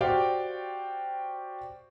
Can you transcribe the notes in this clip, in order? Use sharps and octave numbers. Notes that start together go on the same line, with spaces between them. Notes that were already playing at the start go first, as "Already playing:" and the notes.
F#4 G4 C5 D5 F5 G5